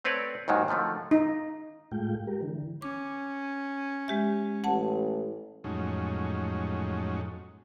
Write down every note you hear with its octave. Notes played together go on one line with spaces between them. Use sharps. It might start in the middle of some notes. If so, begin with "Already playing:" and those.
A3 C4 B4 C#5 D5
D#2 G#2 D#3 F#3
D3 D#3 F3 A3 C4
D#4
A2 G#3 A3 F4 G5
G#3 G4 A#4
D3 E3
C#4 D6
G#3 G4 E5
A1 F#5 A5
F2 A2 F#3 G#3 C#4 D#4